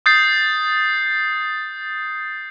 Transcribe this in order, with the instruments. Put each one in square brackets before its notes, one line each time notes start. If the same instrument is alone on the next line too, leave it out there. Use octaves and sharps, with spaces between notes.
[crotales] D#6 G6 A6 C7